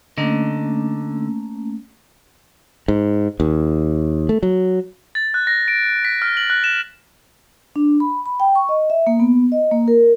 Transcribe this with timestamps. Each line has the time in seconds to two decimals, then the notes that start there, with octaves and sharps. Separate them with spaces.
0.18 D3 A3 A#3 C#4 D#5
2.88 G#2
3.40 D#2
4.29 A3
4.43 F#3
5.15 A6
5.34 F#6
5.47 A#6
5.68 D7
6.05 B6
6.22 F6
6.37 F#7
6.50 F#6
6.64 E7
7.76 D4
8.00 B5
8.26 B5
8.40 G5
8.55 C#6
8.69 D#5
8.90 E5
9.07 A#3
9.20 B3
9.52 D#5
9.71 A#3
9.88 A#4